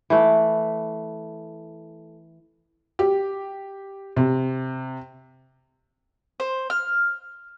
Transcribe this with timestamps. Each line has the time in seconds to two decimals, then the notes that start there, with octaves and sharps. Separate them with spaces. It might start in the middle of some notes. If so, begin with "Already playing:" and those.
0.10 E3 A3
2.99 G4
4.17 C3
6.40 C5
6.70 F6